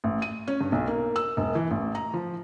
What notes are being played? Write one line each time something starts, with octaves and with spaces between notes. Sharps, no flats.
A1
D#7
C#4
G2
B1
A#3
E6
E1
E3
A1
A#5
F3